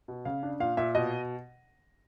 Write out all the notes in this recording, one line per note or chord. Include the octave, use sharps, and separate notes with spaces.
B2
C#3 F5
D4
A#2 F5
A#2 E5
B2 D#5